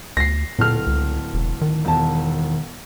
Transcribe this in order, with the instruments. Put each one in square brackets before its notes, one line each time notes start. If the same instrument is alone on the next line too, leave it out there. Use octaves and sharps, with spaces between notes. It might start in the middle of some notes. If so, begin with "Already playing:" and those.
[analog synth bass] D2 [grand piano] A#6 C7
[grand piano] D1 A4 F6 [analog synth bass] A#2
[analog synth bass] C#2
E1
D#3
[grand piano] E1 A5